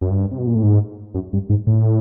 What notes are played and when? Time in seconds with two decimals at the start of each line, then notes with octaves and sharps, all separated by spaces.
0.01 F#2
0.10 G2
0.31 C3
0.38 B2
0.47 A#2
0.55 A2
0.63 G#2
1.14 F#2
1.33 G2
1.50 G#2
1.67 A2